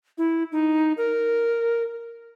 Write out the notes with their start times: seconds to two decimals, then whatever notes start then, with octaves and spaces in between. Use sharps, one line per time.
0.18 E4
0.52 D#4
0.97 A#4